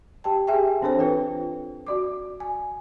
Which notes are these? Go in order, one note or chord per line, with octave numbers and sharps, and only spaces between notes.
G4 G5 A5
G4 G#4 E5 G5 G#5
E3 C4 D4 A4 C5 C#5
F4 B4 G5
F#4 D5 D6
G#5